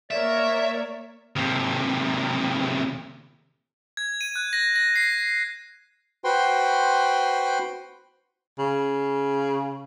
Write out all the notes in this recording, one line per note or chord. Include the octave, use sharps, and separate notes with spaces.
A#3 A#4 C#5 D5 E5
D#2 C3
G#6
D#7
F#6
A#6
A#6
C7
F#4 B4 C5 G5 C6
C#3